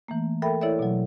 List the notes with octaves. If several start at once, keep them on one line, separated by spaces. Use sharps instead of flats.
E3 A3 A#3
A4 A#4 E5 G5 B5
E4 A4 C#5 D5 E5
B2 F#3